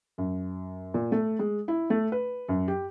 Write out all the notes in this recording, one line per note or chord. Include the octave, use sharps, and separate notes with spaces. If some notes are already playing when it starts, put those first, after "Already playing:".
F#2
A#2
A3
G#3
E4
A3
B4
F#2
G4